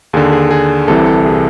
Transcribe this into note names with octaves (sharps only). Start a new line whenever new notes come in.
D#2 D3 G#4
G#4
G#4
C2 C3 E3 A4
A4
G#4